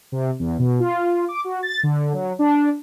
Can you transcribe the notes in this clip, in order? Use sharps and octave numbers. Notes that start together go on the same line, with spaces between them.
C3
E2
B2
F4
D6
F#4
A6
D3
F#3
D4